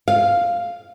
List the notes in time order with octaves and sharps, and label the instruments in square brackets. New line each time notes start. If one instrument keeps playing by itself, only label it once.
[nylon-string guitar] F5